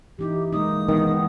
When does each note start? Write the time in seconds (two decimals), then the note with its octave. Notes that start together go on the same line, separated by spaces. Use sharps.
0.19 E3 D#4 E4 G4
0.53 G#3 A#3 D#4 D#6
0.89 D#3 E3 G#3 B3